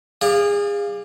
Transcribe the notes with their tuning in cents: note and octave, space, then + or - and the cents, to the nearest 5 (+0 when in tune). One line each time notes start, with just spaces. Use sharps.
G#4 -30 D5 +20 F5 +0